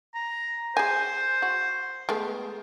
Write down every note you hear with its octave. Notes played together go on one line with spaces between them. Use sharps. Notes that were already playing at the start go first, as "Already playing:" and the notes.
A#5
G#4 C5 G#5
F#4
G#3 A3 B3